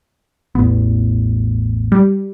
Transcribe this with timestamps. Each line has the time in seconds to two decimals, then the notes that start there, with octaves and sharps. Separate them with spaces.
0.55 A1 E2 B3
1.92 G3